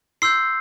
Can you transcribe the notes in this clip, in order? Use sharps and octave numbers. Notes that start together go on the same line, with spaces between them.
C6 E6 G6 C7